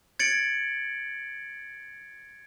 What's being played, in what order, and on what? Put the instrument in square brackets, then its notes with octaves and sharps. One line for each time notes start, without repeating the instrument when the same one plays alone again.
[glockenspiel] G#6 A6 C#7 D7 F#7